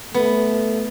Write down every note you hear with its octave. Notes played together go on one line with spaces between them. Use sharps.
A3 B3